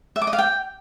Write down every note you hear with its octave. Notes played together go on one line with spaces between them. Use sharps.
E5
D6
D#5
F5
G5